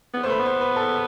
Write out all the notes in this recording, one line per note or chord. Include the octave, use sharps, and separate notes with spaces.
B3
C5
A3 B4
B3
C5
B4
A4